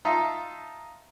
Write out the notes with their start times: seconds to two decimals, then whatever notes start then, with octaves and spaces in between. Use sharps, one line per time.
0.05 D#4 F4 E5 A5 A#5